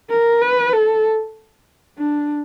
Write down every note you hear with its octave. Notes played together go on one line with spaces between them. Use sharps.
A#4
B4
A4
D4